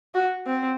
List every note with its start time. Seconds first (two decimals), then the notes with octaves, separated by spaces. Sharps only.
0.14 F#4
0.46 C4